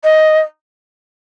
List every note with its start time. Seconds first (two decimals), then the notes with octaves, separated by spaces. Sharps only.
0.03 D#5